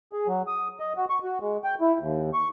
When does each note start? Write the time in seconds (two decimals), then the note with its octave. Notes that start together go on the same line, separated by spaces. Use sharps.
0.13 G#4
0.27 F#3
0.47 D#6
0.80 D#5
0.97 F#4
1.10 C#6
1.24 F#4
1.41 G#3
1.64 G5
1.81 E4
2.00 D#2
2.34 C#6